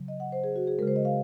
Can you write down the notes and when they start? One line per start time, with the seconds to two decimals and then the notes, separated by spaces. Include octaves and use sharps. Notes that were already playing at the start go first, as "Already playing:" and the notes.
Already playing: C#3 F#3
0.08 D#5
0.20 F#5
0.32 C5
0.44 G#4
0.56 F#4
0.67 G#4
0.79 C#3 G#3 A#4
0.88 C5
0.96 D#5
1.05 F5